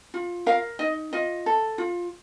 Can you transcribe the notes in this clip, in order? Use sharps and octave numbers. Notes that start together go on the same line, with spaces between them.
F4
A#4 F5
D#4 D#5
F4 D#5
A4
F4